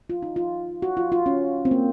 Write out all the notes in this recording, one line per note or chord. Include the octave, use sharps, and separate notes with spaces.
F4
D#4
F4
F#4
F4
F4
C#4
C4
A#3